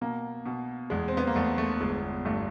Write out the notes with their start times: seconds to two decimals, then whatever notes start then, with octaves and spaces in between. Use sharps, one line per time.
0.01 B2 A#3
0.46 B2
0.90 E2 G#3
1.08 C4
1.17 B3
1.27 A#3
1.36 E2 A3
1.58 A3
1.81 G1 G#3
2.25 G2 A3